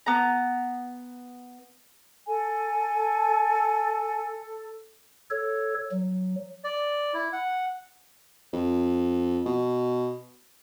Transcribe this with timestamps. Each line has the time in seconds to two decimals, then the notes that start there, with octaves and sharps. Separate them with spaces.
0.06 B3 A#5
2.27 A4 G#5
5.31 A4 C#5
5.91 F#3
6.64 D5
7.14 E4
7.32 F#5
8.53 F2
9.46 B2